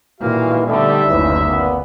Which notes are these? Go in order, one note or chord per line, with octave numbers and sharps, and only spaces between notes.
G2 A#2 D#3 E3 A#3 F#4 F5
D3 G3 A3 B3 D#4 E5
F#1 D2 G#2 C#3 E3
A#2 B3